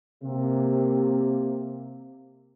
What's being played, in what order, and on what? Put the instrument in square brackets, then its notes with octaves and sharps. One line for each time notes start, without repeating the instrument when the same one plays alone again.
[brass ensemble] C3 A#3